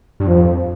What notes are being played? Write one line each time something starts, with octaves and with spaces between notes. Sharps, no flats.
G2
F2 F3